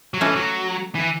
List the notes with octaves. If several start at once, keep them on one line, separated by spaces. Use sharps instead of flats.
F#3
E3 A3 C#4
F#3
E3